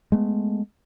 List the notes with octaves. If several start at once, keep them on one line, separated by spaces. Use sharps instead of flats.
G#3 A3 B3